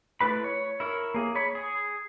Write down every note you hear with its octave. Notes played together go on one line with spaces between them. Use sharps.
A3 E4 B4 B5
C#5
E4 A#4 C#5
A#3 G#4
C#5 B5
G#4